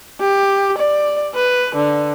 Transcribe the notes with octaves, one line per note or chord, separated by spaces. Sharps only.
G4
D5
B4
D3